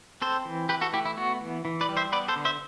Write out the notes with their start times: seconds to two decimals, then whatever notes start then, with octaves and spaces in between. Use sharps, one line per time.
0.22 C4 A4 C5
0.45 E3
0.69 E3 G4 B4
0.81 F#4 A4
0.93 A3 E4 G4
1.06 E4
1.17 B3 F#4
1.41 E3
1.65 E3
1.81 B4 D5
1.89 G3
1.97 C5 E5
2.12 B3 B4 D5
2.28 A4 C5
2.36 D3
2.45 C5 E5